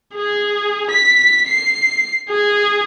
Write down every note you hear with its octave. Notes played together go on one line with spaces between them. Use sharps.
G#4
B6
C7
G#4